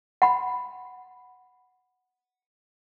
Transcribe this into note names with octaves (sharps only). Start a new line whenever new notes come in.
F#5 B5